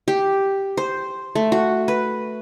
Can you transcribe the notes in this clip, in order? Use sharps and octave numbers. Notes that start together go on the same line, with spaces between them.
G4
C5
A3
F#4
B4